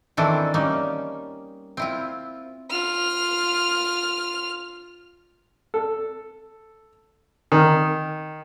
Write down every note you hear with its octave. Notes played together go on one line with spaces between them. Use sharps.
D#3 E3 C4 D4 E4 A4
G3 A#3 C#4 D#4
C4 E4 F4
F4 F6
A4
D#3